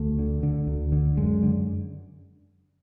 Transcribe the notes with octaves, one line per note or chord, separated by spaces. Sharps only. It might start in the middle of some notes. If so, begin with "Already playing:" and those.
Already playing: D2 A3
D3
D3
D2
D3
F#2 G#3
D3